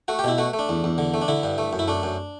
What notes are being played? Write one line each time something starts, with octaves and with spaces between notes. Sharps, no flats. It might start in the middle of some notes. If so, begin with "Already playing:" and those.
A3 F#4
G4
B2 E4
A3 F#4
A3
D4
E2
E2
D3
A3
D4
D3 E4
G2
A3
F#2
E4
A3 D4
F#2